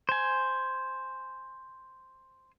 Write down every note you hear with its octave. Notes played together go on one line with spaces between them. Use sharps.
C5 G#5